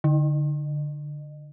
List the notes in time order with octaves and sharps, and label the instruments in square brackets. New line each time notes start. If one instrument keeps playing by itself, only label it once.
[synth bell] D3